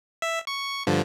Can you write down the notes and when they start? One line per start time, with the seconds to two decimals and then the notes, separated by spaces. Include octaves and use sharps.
0.22 E5
0.47 C#6
0.87 G2 D3 F3